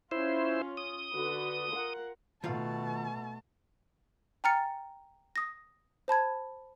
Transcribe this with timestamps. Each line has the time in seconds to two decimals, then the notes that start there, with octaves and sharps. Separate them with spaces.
0.11 C#4 E4 F4 C5
0.77 D#6
1.12 D3 F#4 B4
1.70 F4 A#4 F#5
2.44 B2 D#3 A3 F4 F5 A5
4.44 G5 G#5 A#5 F6 A6 C#7
5.36 D#6 A#6
6.08 C5 A5 B5 G#6